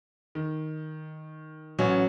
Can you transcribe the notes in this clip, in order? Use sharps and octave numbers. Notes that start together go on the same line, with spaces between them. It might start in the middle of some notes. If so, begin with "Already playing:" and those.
D#3
A1 F#3 C#4